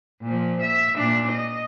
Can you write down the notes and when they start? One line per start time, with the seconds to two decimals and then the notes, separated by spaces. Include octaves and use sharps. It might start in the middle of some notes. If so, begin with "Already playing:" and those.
0.22 A#2 F3
0.61 E5
0.97 A#2 D4
1.31 D#5